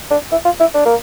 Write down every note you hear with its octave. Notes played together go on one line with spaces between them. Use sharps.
D4
E4
F4
E4
D4
A#3